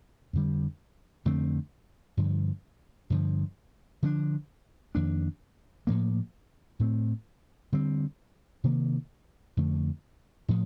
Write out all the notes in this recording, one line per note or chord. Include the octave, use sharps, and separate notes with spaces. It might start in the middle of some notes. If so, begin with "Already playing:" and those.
F2 D3 G3
F2 D3 A3 C4
G2 D3 F3
G2 D3 F3
D3 F3 A#3 D4
F2 D#3 A#3 D4
A2 F3 A#3
A2 A3 C4
D3 G3 C4
C3 D#3 A#3
F2 D3 A3
A2 F3